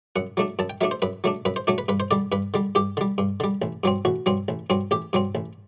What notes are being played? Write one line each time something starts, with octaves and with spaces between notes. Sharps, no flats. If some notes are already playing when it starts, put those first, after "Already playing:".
F#2 F#5
F#3 A3 D4
F#2 A5
G5
F#3 A3 D4 E5
C5
F#2 B4
F#3 A3 D4
F#2 B4
C5
F#3 A3 D4
B4
G2 B4
C5
D3 G3 D5
G2 B4
D3 G3
G2 G4
D3 G3
G2
D3 G3
A1
G2 F#3 C4
A1 F#4
G2 F#3 C4
A1
G2 F#3 C4
A1 G4
G2 F#3 C4
A1